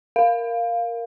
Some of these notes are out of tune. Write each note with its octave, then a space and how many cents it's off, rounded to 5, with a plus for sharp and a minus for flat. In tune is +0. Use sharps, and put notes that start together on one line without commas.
A#4 +0 F5 +0